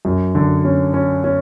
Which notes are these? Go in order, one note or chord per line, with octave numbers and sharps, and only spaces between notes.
F#2
D3
C#4
C#4
C#4